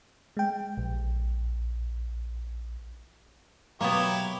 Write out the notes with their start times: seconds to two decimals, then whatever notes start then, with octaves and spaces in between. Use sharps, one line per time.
0.37 G#3 G5
0.77 A#1
3.81 B2 F#3 A#3 B3 E4 G4 C#5